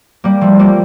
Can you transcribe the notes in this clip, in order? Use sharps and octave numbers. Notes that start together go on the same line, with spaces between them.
G3 A#3
F3 A3
G3 A#3